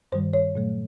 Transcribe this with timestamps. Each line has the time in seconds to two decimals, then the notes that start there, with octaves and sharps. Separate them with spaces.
0.12 G2 D#3 G3 C5
0.33 C#5
0.55 A#2 F#3 A3